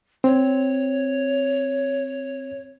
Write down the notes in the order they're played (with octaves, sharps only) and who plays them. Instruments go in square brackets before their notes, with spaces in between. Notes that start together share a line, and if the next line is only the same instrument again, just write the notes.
[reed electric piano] C4 [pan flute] C#5